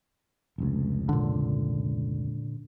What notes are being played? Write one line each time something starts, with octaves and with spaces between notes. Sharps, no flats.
F1 C#2
A#2 D3